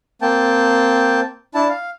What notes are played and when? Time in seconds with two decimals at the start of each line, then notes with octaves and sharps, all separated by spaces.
0.22 A#3 C4 G5 A5
1.55 D4 E4 A5
1.69 F5